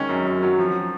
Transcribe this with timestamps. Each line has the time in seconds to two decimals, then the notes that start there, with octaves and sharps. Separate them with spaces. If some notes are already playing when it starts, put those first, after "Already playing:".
Already playing: D#3 G#3 C#4
0.09 F#2
0.26 F#2
0.42 F#3
0.59 F3